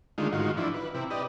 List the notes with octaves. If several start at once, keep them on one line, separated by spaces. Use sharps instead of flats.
D3 D#3 G#3 A3 F4
G#2 D#3 F4 F#4
E3 F3 D4 E4
B4
C3 E4
G4 B4 D5 D#5